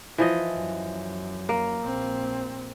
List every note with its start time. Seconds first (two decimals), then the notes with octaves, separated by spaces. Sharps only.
0.18 E3 F3 D#5
0.51 F#2
1.49 A#3
1.84 A#1 C4